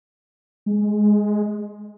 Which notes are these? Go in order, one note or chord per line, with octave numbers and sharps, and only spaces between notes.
G#3